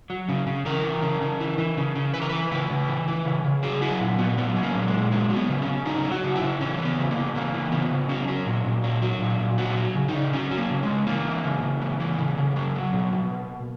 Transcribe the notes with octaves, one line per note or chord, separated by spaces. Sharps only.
F#3
C#3
C#3
E3 A#4
E3
C#3
C#3
E3
E3
C#3
C#3
E3 B4
A#4
E3 B4
C#3 B4
C#3
E3
E3
C#3
C#3
F#3 G#4
F#3 E4
A#2
A#2 B3
F#3 B3
F#3
A#3
A#2
G#3
A#2
F#3 G#3
F#3
B3
C#3
C#4
C#3
F#3 D#4
F#3
F#4
C#3
E4
C#3
E3 C#4
E3
B3
C#3
A#3
C#3
E3 A#3
E3
C#3 B3
C#3
F#3 C#4
F#3
A#2
A#2
F#3
F#3
A#2
A#2
F#3 F#4
F#3
C#3
D#4
C#3
F#3 C#4
F#3
A#3
C#3
G#3
C#3
E3 A#3
E3
C#3
C#3
E3
E3
C#3
C#3
F#3
F#3
B2
B2